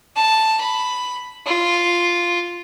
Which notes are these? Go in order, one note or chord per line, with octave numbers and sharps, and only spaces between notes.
A5
B5
F4